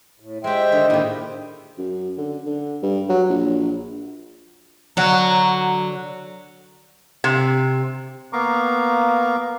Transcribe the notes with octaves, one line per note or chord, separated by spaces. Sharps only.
A2
G#3 G4 C5 E5 G5
D3 D#3
A2 D#3 A#3 G4
F#2
D3
D3
G2
F#3
A#1
D3 F#3 F#4 A#5
C3
A#3 B3 F5 A#5 C#6 D6